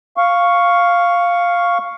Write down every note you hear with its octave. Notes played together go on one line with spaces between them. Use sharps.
F5 C#6